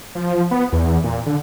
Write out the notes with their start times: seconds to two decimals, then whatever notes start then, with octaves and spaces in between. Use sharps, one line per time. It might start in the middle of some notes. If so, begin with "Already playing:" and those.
0.15 F3
0.51 B3
0.72 E2
1.04 A#2
1.26 D3